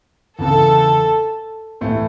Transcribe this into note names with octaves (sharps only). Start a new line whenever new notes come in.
E2 C#3 E3 A4
A2 E3 A3